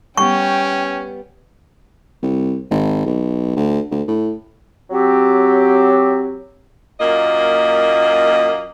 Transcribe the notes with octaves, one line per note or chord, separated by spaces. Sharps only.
G3 B3 C#4 G5 C#6
C2
G#1
B1
D2
D2
A2
F#3 C4 G4
F#2 A#2 A#3 D#5